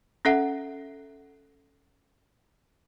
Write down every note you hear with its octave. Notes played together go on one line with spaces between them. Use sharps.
C#4 A4 E5 F#5